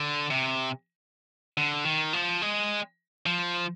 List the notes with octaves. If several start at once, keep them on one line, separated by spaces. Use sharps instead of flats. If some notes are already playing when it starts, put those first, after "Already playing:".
Already playing: D3
C3
D3
D#3
F3
G#3
F3